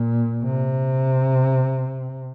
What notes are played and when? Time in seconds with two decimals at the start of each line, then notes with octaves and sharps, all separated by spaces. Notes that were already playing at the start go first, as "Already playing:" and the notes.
Already playing: A#2
0.43 C3